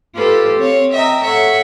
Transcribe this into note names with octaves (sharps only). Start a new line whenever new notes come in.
F4 G4 A4 B4 C5
C4 C#5 F5
D#5 E5 G5 A#5
A4 C#5 E5 F#5